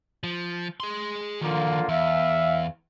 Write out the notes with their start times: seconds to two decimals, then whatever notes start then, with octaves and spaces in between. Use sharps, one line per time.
0.24 F3
0.80 G#4 C6
1.41 D3 D#3 F3 A#3 F4
1.89 E2 E5 F5